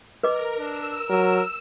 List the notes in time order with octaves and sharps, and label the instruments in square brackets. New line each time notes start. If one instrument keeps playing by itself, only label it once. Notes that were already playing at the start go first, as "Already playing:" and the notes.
[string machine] A#4 [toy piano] B4 D#5 D6
[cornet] D4 [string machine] E6
[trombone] F#3 [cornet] A#4